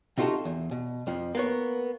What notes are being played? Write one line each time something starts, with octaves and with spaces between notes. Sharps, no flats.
C3 D#4 F4 F#4 A4
E2
B2
F2 F3
A#3 B3 C#5